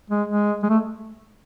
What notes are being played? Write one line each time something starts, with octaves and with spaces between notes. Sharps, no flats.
G#3
G#3
G#3
A3